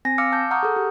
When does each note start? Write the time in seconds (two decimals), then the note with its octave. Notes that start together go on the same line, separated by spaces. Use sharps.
0.05 C4 G#5 A#6
0.18 F5 D6 E6 F6 C#7
0.32 A5 D6 G6
0.51 F#5 A#5 C#6 D#6 F6 G6
0.63 G#4 A4
0.76 G4